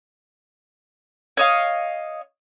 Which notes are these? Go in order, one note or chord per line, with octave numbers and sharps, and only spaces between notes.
C#5 D#5 F5